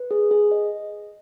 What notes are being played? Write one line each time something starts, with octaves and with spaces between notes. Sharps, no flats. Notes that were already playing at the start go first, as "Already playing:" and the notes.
Already playing: B4
G#4
G#4
D#5